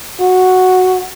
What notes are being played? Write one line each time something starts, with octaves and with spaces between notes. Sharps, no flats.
F#4